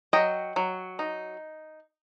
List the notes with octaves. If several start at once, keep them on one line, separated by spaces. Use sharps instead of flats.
F#3 D#5 G5
F#3
D#4